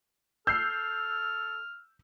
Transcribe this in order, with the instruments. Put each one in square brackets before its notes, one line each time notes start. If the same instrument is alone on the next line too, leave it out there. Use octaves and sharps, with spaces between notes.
[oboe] A4 [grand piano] E6 [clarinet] F6 [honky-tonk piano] G6 C7